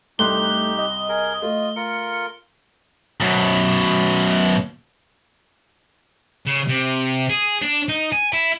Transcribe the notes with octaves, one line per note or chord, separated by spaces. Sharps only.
C2 A3 D#4 G4 C6 F#6 G7
D#5
G#4 A#4
A3 F4
F4 A#4 C#7
F#2 B2
C#3
C3
G#4
D4
D#4
G#5
E4